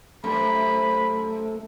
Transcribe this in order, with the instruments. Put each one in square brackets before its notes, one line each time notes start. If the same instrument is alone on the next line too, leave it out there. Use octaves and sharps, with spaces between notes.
[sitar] F#2 C3 [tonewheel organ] A3 [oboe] B5